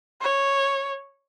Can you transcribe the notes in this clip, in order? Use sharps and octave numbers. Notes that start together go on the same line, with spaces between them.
C#5